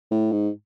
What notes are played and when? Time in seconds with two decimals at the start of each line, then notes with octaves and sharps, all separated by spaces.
0.11 A2
0.32 G#2